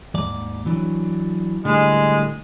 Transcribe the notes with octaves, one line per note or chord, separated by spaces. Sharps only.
D#2 G#2 D5
E3 F#3 D4
A2 D3 G3 G#3